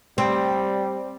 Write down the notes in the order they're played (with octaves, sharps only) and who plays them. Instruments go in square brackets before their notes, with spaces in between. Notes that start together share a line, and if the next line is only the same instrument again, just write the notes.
[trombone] G3 [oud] C4